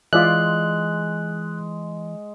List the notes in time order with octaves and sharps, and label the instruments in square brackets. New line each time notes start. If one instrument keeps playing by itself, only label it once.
[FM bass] E3 [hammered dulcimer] G#3 C6 [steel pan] F4 D5 E5 [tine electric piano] F#6